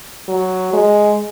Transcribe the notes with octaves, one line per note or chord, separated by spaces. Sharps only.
F#3
G#3